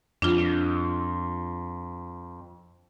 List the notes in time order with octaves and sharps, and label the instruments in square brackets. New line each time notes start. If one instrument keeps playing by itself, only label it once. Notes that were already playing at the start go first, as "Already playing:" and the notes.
[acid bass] F2 [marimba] D4 F4